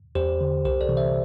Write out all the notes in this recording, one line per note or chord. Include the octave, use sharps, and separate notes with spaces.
E2 G4 C5
D3
C2 G4 C5
A4 D5
C3 E3
C5 E5